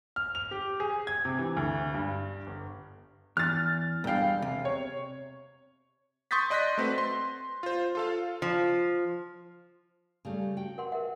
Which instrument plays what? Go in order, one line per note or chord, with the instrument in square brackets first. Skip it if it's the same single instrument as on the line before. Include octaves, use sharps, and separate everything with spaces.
[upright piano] F6
F7
G4
G#4
G#6
C3
E3
D2
G2
G1
[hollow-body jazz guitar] E2 [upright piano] F6 A6
[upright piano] E1 F5 [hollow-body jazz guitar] G2 G5
[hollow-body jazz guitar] C3
[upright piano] C#5
[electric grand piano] C6 C#6 D#6 G6 A6 B6
D5 D#5 C6 F#6 A#6 B6
A3 C4 F#4 B4
C6
F4 C5
F4 A4 F5
[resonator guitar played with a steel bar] F3
[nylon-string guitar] C#3 G3 A3
F#4 G5
[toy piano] A#4 F#5 C6
A#4 E5 F#5